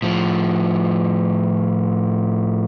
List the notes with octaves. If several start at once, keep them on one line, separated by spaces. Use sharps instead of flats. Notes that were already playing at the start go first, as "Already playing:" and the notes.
A2 F3